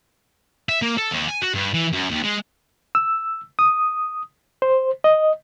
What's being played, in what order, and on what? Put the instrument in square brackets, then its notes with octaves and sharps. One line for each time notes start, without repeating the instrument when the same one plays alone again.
[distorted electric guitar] E5
A#3
A4
D#2
G#5
F#4
G2
E3
F#2
D#2
G#3
[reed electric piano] E6
D#6
C5
D#5